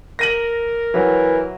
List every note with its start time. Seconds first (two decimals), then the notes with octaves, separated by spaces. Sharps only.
0.19 A#4 A#6 D#7 F#7
0.94 E3 F#3